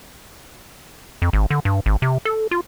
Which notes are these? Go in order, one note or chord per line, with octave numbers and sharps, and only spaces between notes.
F2
G#1
D3
G2
G#1
C3
A4
F4